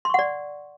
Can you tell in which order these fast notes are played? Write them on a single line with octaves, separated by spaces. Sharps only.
C6 C#6 F#5 D5